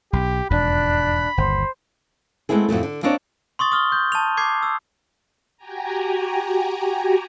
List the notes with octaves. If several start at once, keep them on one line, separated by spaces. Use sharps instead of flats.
B1 G4
E1 F2 G#2 D4 B5 F#6
G1 D#2 C5
G#3 A3 B3 C4 E4 G#4
F2 A2 F#3 A3
D3
A#3 C4 D4 C#5 D#5
C6 C#6 D#6 A6
D#6 F6 G7
G6
A5 F7
D6 G#6 C7
E6
F#4 G4 G5 G#5 A#5